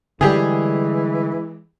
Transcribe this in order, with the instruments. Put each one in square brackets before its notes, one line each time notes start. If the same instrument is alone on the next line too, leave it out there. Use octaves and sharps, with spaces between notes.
[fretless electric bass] D3 G3 [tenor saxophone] E3 [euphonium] G#3 [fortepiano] G4 G#4